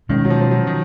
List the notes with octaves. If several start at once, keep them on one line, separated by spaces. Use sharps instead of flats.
B2 D#3 G#3 C#4
F#3
F3
F3
F#3
D#3